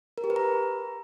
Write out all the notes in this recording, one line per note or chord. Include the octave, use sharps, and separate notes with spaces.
A#4
G4
B4
A#5